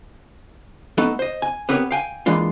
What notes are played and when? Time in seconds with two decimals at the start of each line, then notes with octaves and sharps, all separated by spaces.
0.98 A3 B3 D#4 A4
1.19 C5 D#5
1.42 G#5
1.69 B3 C4 G4 A#4 B4 C#5
1.91 F5 G5 G#5
2.26 E3 G#3 A#3 D4 F4